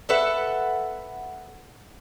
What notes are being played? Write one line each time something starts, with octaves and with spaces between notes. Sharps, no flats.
A4 B4 E5 F#5